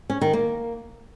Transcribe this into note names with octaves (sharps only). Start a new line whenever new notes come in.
C#4
D#3
A#3